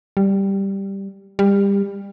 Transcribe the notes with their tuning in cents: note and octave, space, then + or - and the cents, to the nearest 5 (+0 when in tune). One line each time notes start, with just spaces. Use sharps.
G3 +0
G3 +25